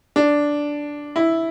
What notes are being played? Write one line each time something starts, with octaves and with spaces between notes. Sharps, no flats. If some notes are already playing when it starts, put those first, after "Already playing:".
D4
E4